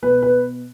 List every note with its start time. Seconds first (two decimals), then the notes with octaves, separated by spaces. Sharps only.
0.02 B2 B4
0.23 B4